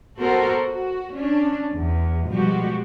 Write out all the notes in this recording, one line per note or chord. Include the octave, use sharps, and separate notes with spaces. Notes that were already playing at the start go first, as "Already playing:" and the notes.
B3 F#4 A4 A#4 C5
F#4
C#4 D4
E2
B2 F3 G3 G#3 F#4 G4